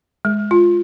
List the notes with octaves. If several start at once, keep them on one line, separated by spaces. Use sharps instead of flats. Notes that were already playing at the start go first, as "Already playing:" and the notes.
G#3
F4